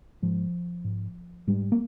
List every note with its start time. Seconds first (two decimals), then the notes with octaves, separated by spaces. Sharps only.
0.22 G#2 F3
0.84 G#2
1.47 G#2 G3
1.72 A#3